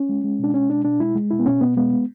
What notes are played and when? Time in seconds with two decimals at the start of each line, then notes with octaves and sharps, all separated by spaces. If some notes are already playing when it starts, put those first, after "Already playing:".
Already playing: C#4
0.09 G#3
0.24 G#3
0.39 B2 D4
0.54 G#3 C#4
0.70 B2 D4
0.85 B2 D4
1.00 G#3 E4
1.15 G#3
1.31 B2 E4
1.39 B3
1.46 B2 C#4
1.61 B2 B3
1.77 G#3 B3
1.93 G#3